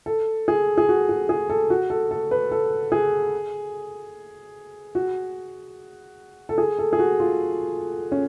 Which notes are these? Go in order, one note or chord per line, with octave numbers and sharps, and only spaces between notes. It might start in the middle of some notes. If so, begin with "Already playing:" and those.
A4
G#4
G#4
F#4
F#4
G#4
A4
F#4
A4
A4
B4
A4
G#4
F#4
A4
G#4
A4
G#4
F#4
F4
C#4